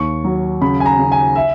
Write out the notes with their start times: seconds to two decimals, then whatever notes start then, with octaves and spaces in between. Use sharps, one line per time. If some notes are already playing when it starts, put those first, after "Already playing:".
Already playing: D#2 C#6
0.24 F#3
0.61 C#3 B5
0.80 G#5
0.86 A#5
0.99 C#3
1.12 G#5
1.35 E5